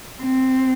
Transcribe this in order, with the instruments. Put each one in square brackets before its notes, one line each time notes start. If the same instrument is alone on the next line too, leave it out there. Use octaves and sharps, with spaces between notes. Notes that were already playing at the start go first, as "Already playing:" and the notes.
[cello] C4